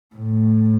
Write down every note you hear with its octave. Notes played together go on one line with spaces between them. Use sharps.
A2